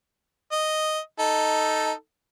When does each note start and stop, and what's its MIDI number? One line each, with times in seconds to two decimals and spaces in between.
0.52 0.99 75
1.19 1.92 63
1.19 1.92 69